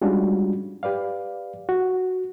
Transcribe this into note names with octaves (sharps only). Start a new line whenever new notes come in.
G3 G#3 C#4 D4 F4 F#4
G4 B4 D5 F5
F#4